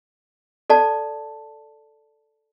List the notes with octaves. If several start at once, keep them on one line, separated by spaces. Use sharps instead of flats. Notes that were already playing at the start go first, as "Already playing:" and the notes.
A4 D5 A5